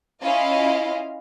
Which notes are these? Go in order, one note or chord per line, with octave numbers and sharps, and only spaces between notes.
C#4 E4 F4 D#5 F5